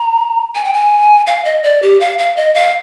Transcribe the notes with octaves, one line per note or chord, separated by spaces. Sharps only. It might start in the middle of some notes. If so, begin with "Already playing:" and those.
Already playing: A#5
G#5
G5
G#5
F5
D#5
D5
G4
F5
F5
D#5
F5